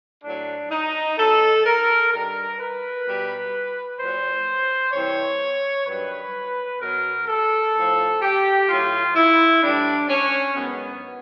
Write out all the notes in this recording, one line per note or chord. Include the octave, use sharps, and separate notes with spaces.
A2 F#3 D4
D#4
B2 F#3 A4
A#4
G2 D#3 G3 A#4
B4
B2 G3
A#2 F#3 C5
C3 E3 G3 C#5
G2 D#3 F#3 B4
B2 F#3 A#4
A4
A2 F3
G4
A2 F#3 F4
E4
A2 E3 G3 D4
C#4
G#2 D#3 F#3 B3